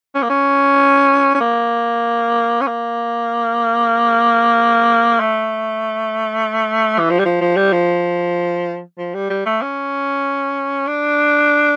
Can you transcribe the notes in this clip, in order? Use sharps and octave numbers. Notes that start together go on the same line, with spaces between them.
C#4
A#3
C#4
C#4
A#3
C#4
A#3
A3
E3
F3
G3
F3
F3
G3
F3
F3
G3
G3
A3
C#4
D4